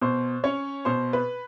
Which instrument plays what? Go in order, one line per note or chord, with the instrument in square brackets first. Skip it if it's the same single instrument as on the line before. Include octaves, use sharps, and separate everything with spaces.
[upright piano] B2 C5
C#4 C#5
B2 C5
B4